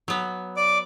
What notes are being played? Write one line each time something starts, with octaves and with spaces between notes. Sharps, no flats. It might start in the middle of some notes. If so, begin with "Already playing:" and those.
F#3 B3
D5 D6